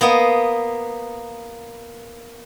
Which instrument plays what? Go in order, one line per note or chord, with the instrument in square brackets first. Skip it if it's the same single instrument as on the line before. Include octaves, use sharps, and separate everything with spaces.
[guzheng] A#3 B3 D#5